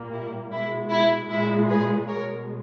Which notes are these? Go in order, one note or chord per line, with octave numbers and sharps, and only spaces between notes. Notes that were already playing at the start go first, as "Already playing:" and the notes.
Already playing: A#2 G3 A#3
E4
B2 G#3 E4
E4
A#2 G#3 E4
G#4 B4
B2 G#3 A#4 C#5